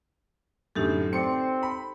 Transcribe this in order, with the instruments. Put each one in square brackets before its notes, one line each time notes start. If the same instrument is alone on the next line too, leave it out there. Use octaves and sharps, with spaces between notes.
[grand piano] F#2 A2 D3 [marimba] D#4 G4 A4
[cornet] C4 [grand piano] D5 C6 C#7
[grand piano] B5